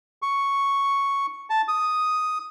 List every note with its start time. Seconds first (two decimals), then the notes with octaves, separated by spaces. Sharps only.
0.22 C#6
1.50 A5
1.68 D#6